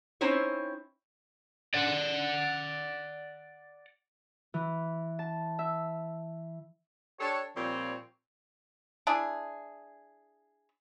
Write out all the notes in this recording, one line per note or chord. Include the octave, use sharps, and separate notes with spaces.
C4 C#4 D#4 E4 C5 C#5
D5 F#5
E3
A5
E5
D4 G4 A4 C#5
A#2 F3 G3 C4 C5 C#5
D4 E4 G#4